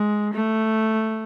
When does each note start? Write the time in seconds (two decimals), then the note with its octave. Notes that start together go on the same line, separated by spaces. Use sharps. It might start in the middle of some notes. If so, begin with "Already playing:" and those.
Already playing: G#3
0.34 A3